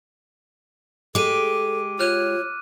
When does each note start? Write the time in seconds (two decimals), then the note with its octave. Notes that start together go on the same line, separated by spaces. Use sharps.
1.15 G#3 G4 A4 D6 D#7
1.99 F4 C#5 F6 F#6 D#7